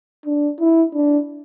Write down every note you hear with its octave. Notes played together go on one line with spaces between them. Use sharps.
D4
E4
D4